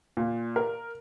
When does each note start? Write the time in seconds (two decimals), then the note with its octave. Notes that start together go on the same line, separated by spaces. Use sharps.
0.17 A#2
0.56 A#4